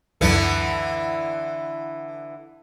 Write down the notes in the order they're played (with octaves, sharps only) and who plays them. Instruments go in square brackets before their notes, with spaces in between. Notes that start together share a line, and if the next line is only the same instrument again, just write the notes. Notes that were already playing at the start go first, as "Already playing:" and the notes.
[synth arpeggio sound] C#2 F#2 [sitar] D3 E3 B3